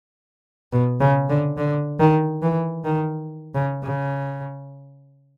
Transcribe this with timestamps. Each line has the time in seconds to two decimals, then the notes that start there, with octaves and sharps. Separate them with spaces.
0.73 B2
1.00 C#3
1.29 D3
1.57 D3
2.00 D#3
2.42 E3
2.84 D#3
3.55 C#3
3.83 C#3